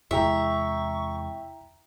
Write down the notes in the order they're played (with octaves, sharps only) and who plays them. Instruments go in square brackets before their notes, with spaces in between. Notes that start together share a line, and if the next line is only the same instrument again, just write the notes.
[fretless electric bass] E2 C3 G#3 [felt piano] E4 G5 A#5 [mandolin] E5 [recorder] C#6